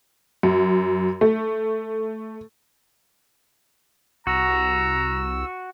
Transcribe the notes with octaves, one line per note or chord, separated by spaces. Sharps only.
F#2
A3
C2 F#4 A#5 E6